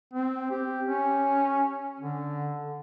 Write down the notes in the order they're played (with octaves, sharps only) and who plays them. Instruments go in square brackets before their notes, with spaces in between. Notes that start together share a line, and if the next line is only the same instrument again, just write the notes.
[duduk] C4
G4
C#4
D3